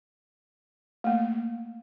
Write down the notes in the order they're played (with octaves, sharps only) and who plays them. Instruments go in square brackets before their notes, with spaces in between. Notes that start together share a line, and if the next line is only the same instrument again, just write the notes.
[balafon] A3 A#3